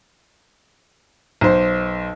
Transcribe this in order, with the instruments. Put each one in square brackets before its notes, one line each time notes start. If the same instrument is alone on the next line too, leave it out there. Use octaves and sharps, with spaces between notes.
[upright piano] B1 C5